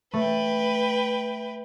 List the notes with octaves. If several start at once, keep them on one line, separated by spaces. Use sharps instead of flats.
A3 B4 G5